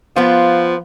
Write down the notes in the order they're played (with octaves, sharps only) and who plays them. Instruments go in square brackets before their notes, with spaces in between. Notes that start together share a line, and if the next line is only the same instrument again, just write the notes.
[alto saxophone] F3 [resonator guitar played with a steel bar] B3 F4